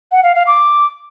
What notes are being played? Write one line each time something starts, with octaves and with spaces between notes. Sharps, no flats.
F#5
F5
F5
D6